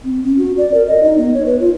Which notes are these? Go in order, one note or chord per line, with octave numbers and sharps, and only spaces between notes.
C4
C#4
F#4
D5
A#4
D#5
D#4
B3
C#5
B4
F4